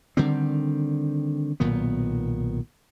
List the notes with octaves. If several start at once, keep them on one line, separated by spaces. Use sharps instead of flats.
D3 D#3 G3 C4
B1 A#2 D#3 B3